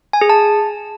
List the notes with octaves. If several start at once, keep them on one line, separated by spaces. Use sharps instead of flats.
G#5
G#4
A5